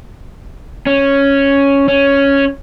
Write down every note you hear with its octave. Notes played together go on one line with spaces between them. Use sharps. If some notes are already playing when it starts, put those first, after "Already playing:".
C#4
C#4